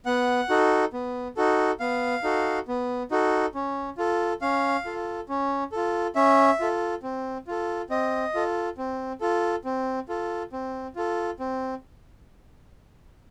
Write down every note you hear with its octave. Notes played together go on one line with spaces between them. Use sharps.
B3 F#5
D#4 F#4 A4
B3
D#4 F#4 A4
B3 F5
D#4 F#4 A4
B3
D#4 F#4 A4
C#4
F4 A4
C#4 F5
F4 A4
C#4
F4 A4
C#4 E5
F4 A4
C4
F4 A4
C4 D#5
F4 A4
C4
F4 A4
C4
F4 A4
C4
F4 A4
C4